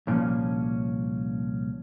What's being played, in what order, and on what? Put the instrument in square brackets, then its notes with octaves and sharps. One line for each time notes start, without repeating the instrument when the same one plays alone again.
[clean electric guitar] C2 A#2 E3 F3 C#4